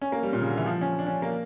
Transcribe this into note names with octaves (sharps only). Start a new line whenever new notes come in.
C#4
A#3
G3
A#2
C#3
D3
E3
F3
C#4
D4
C#4
A#3